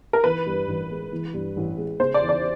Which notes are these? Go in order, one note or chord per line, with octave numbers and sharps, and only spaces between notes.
A#4
E3 B4
G2
A1
G#3
E3
G2
A1
G#3
C#3 C5
D5
E2
D5